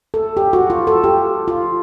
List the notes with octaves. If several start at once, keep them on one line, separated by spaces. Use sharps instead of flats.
A4
G4
F#4
F4
A4
G4
F4